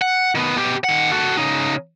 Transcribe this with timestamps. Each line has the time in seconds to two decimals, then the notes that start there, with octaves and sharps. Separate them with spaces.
0.02 F#5
0.35 D#3 B3
0.56 B2 G4
0.84 D#3 F#5
1.12 F#4 A4
1.37 C#3 D#4